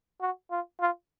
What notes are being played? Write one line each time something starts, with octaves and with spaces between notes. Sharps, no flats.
F#4
F4
F4